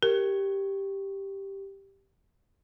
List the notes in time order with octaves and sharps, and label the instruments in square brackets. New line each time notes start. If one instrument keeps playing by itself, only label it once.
[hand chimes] G4 [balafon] A#4